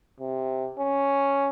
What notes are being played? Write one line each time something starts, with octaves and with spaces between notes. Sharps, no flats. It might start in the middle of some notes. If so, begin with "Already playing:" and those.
C3
C#4